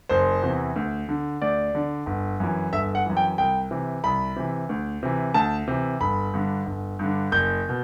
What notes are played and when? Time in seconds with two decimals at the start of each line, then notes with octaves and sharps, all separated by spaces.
0.09 F#1 C5
0.42 E2 C3 E3
0.76 D2
1.09 D3
1.42 D2 D5
1.75 D3
2.06 G1
2.40 F#2 E3
2.72 G1 E5
2.95 F#5
3.06 F#2 E3
3.17 G5
3.38 C2 G5
3.71 C3 E3
4.04 C2 B5
4.36 C3 E3
4.69 D2
5.03 C3 E3
5.34 D2 A5
5.68 C3 E3
6.01 G1 B5
6.34 G2 D3
6.66 G1
6.99 G2 D3
7.32 F#1 G6
7.69 B2